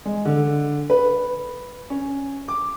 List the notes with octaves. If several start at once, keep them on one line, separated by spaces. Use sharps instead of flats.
G#3
D3
B4
C#4
D6